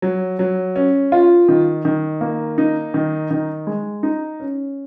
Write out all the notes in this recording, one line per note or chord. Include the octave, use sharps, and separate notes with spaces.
F#3
F#3
C#4
F4
D#3
D#3
A#3
D#4
D#3
D#3
G#3
D#4
C#4